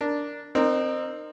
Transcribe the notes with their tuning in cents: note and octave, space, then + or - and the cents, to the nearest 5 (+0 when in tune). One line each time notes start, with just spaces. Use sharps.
D4 -5 A#4 +0
C4 +0 D#4 -35 A#4 +0